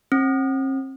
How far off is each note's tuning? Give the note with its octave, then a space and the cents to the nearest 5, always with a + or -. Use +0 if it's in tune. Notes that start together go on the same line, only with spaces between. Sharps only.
C4 +45